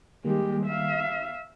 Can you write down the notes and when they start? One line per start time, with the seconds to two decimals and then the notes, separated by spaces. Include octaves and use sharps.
0.25 D#3 G3 G#3 A#3 G4
0.66 E5 F5